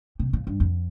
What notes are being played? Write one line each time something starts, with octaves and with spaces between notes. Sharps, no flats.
C3
A#2
G2
F2